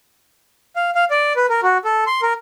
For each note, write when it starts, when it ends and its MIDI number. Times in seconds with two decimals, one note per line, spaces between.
0.76 0.90 77
0.95 1.05 77
1.11 1.33 74
1.36 1.46 71
1.49 1.61 70
1.63 1.78 66
1.85 2.04 69
2.07 2.21 84
2.22 2.33 70